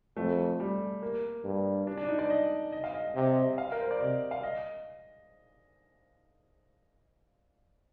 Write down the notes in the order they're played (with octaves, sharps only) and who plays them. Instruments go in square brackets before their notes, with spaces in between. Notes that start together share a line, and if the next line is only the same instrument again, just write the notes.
[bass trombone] F2 [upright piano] A3
[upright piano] A3
G3
A#3
[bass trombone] G2
[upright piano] D4
D4
D#4
D5
D#5
D#5
F5
D#5
[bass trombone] C3 [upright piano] D#5
[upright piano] D#5
F5
A#4
C5
D5
[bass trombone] C3 [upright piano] D#5
[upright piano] F5
D#5